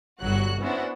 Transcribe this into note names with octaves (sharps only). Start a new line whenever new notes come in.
G1 F#3 F#4 F#6
B3 C#4 D4 E4 F#4 C5